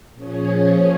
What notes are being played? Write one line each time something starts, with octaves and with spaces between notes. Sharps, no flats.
A#2 F3 C#4 G#4 C#5